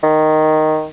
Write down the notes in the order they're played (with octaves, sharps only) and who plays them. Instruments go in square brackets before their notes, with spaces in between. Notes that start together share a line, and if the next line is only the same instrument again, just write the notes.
[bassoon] D#3